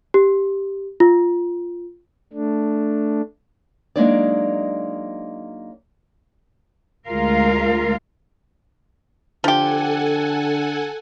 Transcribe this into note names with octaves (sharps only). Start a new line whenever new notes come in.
G4
F4
A3 D4
F#3 G#3 A#3 D4 D#4 D5
D2 G#3 F4 A#4 F5
D3 F3 G4 A4 F#5 G#5